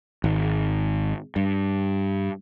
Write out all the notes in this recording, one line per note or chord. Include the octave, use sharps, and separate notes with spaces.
G#1
G2